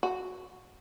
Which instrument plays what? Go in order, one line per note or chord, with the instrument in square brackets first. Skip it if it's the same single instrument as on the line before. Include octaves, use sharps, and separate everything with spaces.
[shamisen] F#4